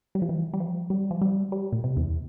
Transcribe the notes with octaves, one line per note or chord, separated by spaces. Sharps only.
G3
F3
E3
G3
F3
G3
F3
G3
G3
A#2
C3
E2